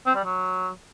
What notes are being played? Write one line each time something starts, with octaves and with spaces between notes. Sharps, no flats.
C4
G3
F#3